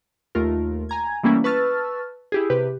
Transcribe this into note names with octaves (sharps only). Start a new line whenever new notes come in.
D#2 A3 F4 A#4
G#5 A#5 G#6
E3 G3 A3 A#3 C#4 E4
B4 A5 C#6 E6 F6 A6
E4 G4 G#4
C3 G4 B4